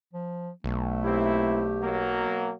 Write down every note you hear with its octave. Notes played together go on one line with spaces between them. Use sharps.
F3
B1 A3
A#3 C4 E4 G4
B2 F#3 A#3